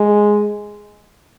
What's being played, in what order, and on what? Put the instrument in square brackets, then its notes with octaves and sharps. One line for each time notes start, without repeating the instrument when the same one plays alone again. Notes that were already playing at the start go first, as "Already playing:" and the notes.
Already playing: [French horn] G#3